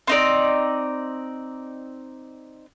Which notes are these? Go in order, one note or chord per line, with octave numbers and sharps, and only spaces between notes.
C4 D#4 D5